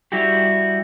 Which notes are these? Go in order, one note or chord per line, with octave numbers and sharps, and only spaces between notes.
G3 E4 F#4 G4